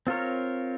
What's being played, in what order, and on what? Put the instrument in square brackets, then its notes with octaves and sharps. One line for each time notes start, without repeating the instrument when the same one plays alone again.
[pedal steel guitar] C4 F4 A#4 C#5